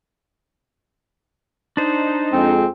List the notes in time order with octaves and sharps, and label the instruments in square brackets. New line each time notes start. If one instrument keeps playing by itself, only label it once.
[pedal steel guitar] D4 C5 [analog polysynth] D#4
[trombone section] F2 G#3 [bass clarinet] C4